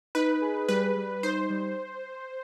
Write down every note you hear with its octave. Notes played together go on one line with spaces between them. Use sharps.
D#4 B4
G#4
G3 B4
G3
D#4 C5
G3